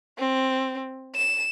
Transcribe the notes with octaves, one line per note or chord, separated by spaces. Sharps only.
C4
E7